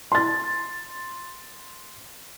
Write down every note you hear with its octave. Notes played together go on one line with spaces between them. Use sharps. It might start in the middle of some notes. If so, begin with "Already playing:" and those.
C6 A6